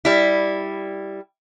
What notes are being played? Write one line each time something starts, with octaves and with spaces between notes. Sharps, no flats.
G3 E4